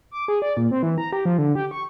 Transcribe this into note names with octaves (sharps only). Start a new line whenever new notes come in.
D6
G#4
D5
A#2
C4
E3
A#5
G4
F3
D3
G4
C#6